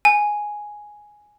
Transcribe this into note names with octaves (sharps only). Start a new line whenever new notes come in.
G#5